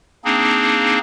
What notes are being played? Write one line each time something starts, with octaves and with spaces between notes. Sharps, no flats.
A#3 C4 D4 D#4 G#4